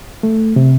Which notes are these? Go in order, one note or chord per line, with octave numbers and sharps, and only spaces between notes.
A3
C3